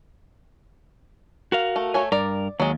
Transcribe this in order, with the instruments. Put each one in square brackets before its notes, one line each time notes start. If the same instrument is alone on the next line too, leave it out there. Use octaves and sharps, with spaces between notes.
[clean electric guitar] F#4 A#4 F5
[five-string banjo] A3
A3 C#5 G#5
[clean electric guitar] G2 A#4 [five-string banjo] D5
[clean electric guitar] D#2 [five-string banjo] F#3 G#3